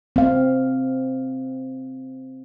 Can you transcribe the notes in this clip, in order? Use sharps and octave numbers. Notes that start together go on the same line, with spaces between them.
C4 F5